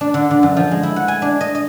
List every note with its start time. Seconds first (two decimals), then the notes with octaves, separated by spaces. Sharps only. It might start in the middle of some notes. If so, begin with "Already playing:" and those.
0.01 D4
0.14 D3
0.31 D3
0.43 F#2
0.57 F3
0.71 G#3
0.83 E4
0.96 F#5
1.08 G#5
1.22 D4
1.41 D#5
1.55 D#5